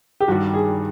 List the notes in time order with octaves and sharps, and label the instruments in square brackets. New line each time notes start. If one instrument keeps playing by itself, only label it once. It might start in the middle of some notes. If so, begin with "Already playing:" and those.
[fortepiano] G4
[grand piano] G2 D#3 G3 [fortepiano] F#4
[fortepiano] G#4